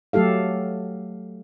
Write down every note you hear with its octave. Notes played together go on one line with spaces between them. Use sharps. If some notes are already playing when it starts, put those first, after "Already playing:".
F#3 A3 G4 A4 F5